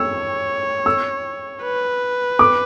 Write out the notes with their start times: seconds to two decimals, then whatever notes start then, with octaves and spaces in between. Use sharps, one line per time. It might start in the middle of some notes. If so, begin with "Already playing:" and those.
Already playing: C#5 E6
0.86 E6
1.63 B4
2.39 D6